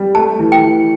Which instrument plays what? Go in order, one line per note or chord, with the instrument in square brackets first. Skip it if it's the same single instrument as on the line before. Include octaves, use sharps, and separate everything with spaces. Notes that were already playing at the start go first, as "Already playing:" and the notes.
Already playing: [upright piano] G3
[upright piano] A3 [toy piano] A5
[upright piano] E3
[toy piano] G5
[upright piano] E3